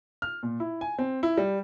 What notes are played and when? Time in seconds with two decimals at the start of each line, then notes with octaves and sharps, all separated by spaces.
0.22 F6
0.43 A#2
0.60 E4
0.81 G#5
0.99 C4
1.23 E4
1.38 G3